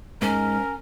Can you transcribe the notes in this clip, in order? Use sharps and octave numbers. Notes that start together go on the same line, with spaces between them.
G#2 C#4 A#4